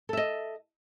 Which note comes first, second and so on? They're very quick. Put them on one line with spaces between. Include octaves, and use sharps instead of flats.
A4 E5 D#5